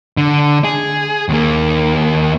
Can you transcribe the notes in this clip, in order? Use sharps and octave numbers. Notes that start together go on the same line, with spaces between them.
D3
G#4
D#2 A#3